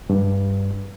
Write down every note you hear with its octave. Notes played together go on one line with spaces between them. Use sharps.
G2